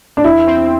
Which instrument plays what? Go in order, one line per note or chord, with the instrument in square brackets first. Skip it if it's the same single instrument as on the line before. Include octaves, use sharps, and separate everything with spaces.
[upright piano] D4
[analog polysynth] E2 [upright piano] E4
[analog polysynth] C4